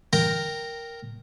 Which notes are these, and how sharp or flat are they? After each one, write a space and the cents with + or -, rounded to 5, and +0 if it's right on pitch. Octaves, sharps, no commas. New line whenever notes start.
A#4 +0 G5 +0 A#5 -10